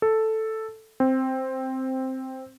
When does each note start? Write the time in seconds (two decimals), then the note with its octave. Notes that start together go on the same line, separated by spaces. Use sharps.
0.02 A4
1.00 C4